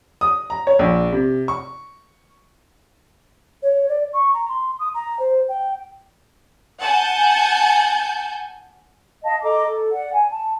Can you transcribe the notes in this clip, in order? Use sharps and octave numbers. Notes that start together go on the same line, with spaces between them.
D#6
A#5
C#5
A#1
C3
C#6
C#5
D5
C#6
A#5
C6
D#6
A#5
C5
G5
F#5 G#5 A5 G6
D#5 F5 A5
A4 D#5 A#5 D6
A4
D5 F#5
G#5
A5